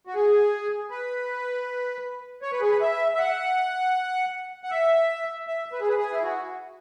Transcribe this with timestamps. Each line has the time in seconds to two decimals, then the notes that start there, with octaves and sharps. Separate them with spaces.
0.07 F#4
0.15 G#4
0.90 B4
2.42 C#5
2.52 B4
2.61 G#4
2.70 B4
2.81 E5
3.14 E5
3.19 F#5
4.64 F#5
4.71 E5
5.47 E5
5.72 B4
5.81 G#4
5.88 B4
5.98 G#4
6.12 E4
6.23 F#4